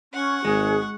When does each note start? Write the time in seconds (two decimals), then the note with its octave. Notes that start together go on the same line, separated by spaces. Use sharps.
0.13 C#4 F#5 C#6
0.45 G#1 G#3 G#4